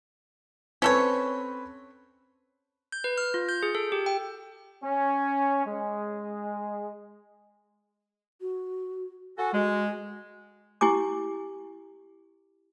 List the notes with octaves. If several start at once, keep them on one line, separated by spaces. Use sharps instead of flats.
C4 C#4 A4 B4 C#5
G6
B4
F6
F4
G6
G#4
A4
G4
G5
C#4
G#3
F#4
F#4 A4 G#5
G#3 F#4
E4 G4 G#5 D6